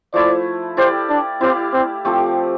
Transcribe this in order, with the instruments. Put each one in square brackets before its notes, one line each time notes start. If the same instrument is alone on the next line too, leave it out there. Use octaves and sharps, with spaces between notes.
[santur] F3 A3 E4 [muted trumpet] D5
[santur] E4 G4 D5 F5 [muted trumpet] C5
[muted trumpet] D4
[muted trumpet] C4 [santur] E4 G4 D5 F5
[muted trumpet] C4
[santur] F3 A3 C4 G4